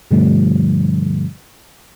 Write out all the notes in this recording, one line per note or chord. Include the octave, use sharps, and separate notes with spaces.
G2 B2 D3 F3 G3 A3